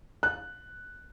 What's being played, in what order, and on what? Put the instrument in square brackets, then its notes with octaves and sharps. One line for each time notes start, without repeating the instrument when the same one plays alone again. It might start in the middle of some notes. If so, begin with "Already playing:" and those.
[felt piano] F#6